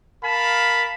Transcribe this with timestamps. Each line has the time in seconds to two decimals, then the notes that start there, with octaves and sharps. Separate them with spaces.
0.25 A#4 F5 A5 B5